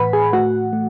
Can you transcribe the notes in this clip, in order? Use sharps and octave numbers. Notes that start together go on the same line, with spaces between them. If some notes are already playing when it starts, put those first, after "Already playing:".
Already playing: A2 E3 B4 F#5 B5
G#4 G#5
A3 F#4 F#5
A3